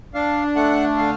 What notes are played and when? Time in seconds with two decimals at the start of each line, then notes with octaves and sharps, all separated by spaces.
0.14 D4 F5
0.56 A3 F#5
0.97 D3 F5